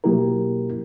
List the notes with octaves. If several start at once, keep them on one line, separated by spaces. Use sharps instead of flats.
B2 F#3 A#3 E4 G4 A#4